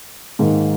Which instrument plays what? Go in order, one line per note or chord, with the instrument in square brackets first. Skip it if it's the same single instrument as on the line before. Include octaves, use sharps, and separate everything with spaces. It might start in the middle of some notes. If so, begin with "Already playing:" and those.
[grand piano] G#2 D#3 A#3